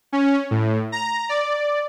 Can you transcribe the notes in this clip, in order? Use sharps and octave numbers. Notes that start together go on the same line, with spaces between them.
C#4
A2
A#5
D5